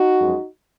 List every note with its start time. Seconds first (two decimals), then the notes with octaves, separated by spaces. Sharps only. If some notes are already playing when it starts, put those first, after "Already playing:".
Already playing: D#4 F#4
0.19 F#2 F3 G#3